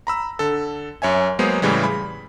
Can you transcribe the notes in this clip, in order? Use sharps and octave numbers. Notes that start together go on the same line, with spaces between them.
A#5 B5 E6
D3 A4
F#2 C#5 E5 G#5
F#3 G#3 A#3 B3 G#4 C5
A2 C#3 E3 G3 G#3
B5